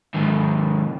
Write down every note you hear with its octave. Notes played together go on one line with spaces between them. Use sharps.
D#2 G#2